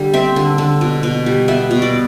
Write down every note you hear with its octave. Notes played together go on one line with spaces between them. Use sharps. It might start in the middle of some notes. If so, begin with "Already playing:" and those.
Already playing: D3 G3
C4 E5
D3
D3
B2
B2
G3
B3 E5
B2
D5